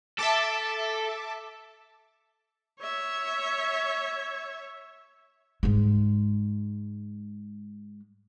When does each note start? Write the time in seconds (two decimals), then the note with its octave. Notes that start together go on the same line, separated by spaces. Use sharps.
0.19 A4 E5 A5 D6
2.80 C#5 E5
5.63 G#2 G#3